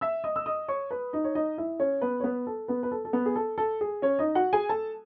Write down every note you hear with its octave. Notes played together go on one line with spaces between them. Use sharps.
E5 E6
D#5 D#6
E6
D#5 D#6
C#5 C#6
B4 B5
D#4 D#5
C#5
D#4 D#5
E4 E5
C#4 C#5
B3 B4
C#5
B3 B4
A4
B3 B4
B4
A4
A4
B3 B4
G#4
A4
A4
G#4
C#4 C#5
D#4 D#5
F#4 F#5
G#4 G#5
A4 A5